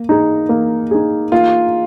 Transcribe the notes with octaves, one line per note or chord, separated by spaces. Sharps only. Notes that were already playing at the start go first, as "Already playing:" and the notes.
Already playing: A#3
D#4 G#4
A#3
D#4 G#4
A#3 F4